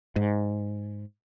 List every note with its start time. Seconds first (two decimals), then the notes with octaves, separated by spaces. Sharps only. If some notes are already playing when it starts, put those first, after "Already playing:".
0.16 G#2